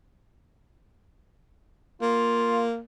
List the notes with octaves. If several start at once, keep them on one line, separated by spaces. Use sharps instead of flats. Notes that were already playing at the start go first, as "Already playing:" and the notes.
A#3 F4